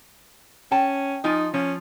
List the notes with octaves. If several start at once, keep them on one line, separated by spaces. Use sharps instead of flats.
C#4 G5 A5
F3 D#4 F4 G#5
F3 C#4 F4